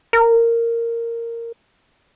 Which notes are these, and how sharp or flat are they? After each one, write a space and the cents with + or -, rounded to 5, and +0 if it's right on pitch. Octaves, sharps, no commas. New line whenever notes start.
A#4 -10